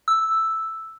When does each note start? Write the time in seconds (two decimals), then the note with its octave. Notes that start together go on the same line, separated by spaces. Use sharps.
0.08 E6